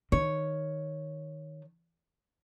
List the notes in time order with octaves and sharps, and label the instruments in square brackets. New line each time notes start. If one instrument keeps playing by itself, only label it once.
[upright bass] D#3 [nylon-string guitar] C#5